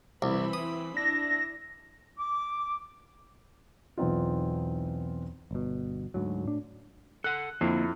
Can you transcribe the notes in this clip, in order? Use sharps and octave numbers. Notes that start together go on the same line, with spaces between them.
C2 E3 C4 B5
D#6
D4 E4 A#6
D6
B1 E2 B3 C4 D#4 F4
G1 B2
D2 G#2 F#3
A2 D4
A4 F#5 F#6
F2 D3 A#3 E4